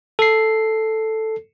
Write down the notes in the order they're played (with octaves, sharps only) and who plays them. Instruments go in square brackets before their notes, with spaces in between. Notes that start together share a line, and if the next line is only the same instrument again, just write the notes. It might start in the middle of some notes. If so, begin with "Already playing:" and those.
[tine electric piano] A4 C7